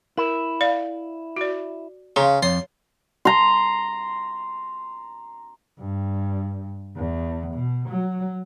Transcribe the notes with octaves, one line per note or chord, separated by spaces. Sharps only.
E4 A#4
D5 F5
F#4 D5
C#3 F5 A#5 C6
F2 C#5 C6
A#5 C6
G2
E2
B2
F#3